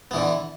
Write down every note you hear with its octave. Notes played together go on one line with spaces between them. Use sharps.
D3 E3 B3